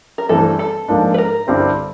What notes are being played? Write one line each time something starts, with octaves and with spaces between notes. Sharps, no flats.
A#4
G2 E3 A3 C4 A4
A4
G#2 F3 A#3 D4 F4
B4
A#4
G2 D3 G3 C4 E4